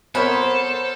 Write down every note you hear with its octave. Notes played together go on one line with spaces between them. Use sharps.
B3 A4 A#4 C5 C#5 B5